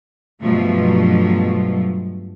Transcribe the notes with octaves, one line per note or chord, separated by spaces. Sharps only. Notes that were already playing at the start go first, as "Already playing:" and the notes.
G2 B2 F3 F#3 A3